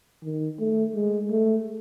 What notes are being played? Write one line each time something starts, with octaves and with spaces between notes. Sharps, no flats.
D#3
A3
G#3
A3